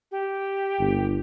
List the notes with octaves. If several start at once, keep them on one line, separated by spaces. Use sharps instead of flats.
G4
G1